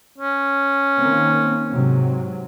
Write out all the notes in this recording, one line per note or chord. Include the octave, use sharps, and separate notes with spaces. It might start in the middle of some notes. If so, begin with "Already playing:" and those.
C#4
D#3 A#3 C4
G#2 C3 F#3